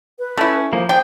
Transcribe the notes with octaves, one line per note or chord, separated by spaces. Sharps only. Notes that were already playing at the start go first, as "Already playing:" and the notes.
B4
A3 C#4 E4
F3 A#3 C5
D4 G4 G#4 C5 G5